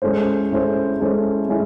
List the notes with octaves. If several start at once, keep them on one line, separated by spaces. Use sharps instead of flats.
G#3 C#4 E4 A4 C5
G#3 C#4 E4 A4 C5
G#3 C#4 E4 A4 C5
G#3 C#4 E4